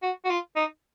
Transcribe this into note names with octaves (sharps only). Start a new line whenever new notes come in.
F#4
F#4
F4
D#4